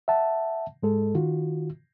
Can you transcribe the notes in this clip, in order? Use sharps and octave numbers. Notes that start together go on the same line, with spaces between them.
E5 F#5 A5
G#2 G#3 A4
D#3 F4 F#4